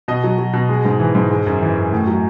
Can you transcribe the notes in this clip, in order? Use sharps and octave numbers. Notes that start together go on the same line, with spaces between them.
B2 D#5
F#3
F#3
B2
G#3
G#2
E3
G#2
G#3
F#2
E3
F#2
A2
F#3